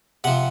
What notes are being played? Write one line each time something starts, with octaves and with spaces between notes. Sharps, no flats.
C3 F3 F#5